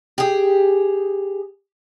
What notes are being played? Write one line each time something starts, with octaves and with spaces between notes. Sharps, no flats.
G4 G#4